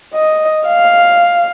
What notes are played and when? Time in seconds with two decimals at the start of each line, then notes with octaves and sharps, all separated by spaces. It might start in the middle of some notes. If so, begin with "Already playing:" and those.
0.14 D#5
0.67 F5